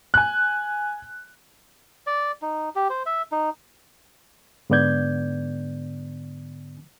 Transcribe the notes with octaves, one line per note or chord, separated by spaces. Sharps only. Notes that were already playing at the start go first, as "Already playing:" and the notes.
G#5 F#6
D5
D#4
G4
C5
E5
D#4
G#2 D3 B3 D5 G6 G#6